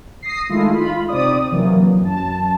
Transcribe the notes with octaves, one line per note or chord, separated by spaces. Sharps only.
D#6 A#6 C7
D#3 G#3 A3 E4 F4
F4 B5
C3 C4 D#4 D5 D#6
C3 E3 F#3 A#3
F#2 A5